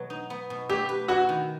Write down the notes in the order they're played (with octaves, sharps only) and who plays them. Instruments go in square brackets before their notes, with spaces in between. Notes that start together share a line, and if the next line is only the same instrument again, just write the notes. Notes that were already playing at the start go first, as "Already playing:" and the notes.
Already playing: [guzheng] B2 F#3 B3
D#4
B3
B2
[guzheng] A3 [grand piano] G4
[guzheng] B4
[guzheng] E4 [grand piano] F#4
[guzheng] D#3